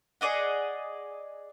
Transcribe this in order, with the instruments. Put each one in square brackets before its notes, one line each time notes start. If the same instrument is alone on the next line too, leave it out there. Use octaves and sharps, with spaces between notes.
[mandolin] G#4 D5 D#5 F#5